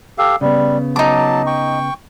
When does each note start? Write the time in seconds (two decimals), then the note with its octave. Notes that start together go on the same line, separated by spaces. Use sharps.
0.18 G4 A4 F5
0.41 C#3 G3 B3
0.96 F#3 D#4 A5 D6
1.47 G5 C#6